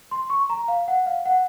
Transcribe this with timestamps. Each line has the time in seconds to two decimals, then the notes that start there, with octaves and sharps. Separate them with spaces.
0.11 C6
0.30 C#6
0.50 A#5
0.68 F5
0.88 F#5
1.06 F5
1.26 F#5